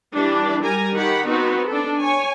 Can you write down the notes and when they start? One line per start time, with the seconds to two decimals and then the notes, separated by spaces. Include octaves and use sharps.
0.14 E3 G3 D4
0.63 G3 A#4 G#5 A#5
0.95 D#3 G4 F#5 B5
1.27 B3 C4 D#4 F#4
1.68 D4 A4
2.02 C#5 G#5